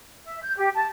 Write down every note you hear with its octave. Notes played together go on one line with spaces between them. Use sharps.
E5
G6
G4
A5